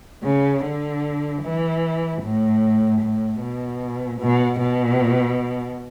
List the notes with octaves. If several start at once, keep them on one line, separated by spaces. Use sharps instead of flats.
C#3
D3
E3
A2
A2
B2
B2
B2